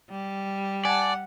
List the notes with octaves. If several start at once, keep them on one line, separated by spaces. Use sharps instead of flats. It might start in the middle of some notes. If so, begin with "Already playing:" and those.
G3
D5 F#5 G#5 A5